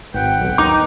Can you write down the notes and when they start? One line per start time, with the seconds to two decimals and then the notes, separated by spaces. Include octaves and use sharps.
0.14 G#1 B4 F#5 G5
0.40 B1
0.58 D#2 D#4 D6